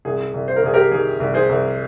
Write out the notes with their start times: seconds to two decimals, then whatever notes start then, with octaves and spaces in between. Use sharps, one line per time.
0.05 C2 G#4
0.34 C2
0.48 C5
0.56 A#4
0.63 C2 G#4
0.74 G4 A#4
0.91 D#3 G#4
1.20 C2
1.34 G#4 C5
1.49 C2